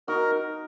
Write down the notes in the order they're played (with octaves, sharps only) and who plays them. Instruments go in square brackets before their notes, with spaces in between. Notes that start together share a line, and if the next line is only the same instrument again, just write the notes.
[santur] D#4 F#4 [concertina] A#4